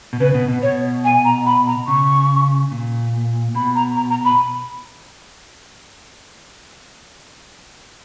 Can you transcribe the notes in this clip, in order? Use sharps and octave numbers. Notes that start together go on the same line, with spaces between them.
B2
C#3 B4
B2
B2
B2 C#5
G#5
A#5
B5
A#5
C#3 C#6
A#2
B2 B5
A#5
A#5
A#5
B5